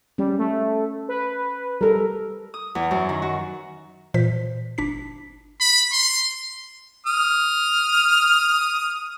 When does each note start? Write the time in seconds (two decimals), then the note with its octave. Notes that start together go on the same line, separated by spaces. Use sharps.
0.18 G3 C#4
0.39 A3
1.09 B4
1.81 G3 A4 A#4
2.54 D#6
2.75 E2
2.91 F#2
3.09 D#3
3.22 F#4
4.14 A#2 E3 C5 B6
4.78 G1 D4 B6
5.61 B5
5.93 C6
7.06 D#6 F6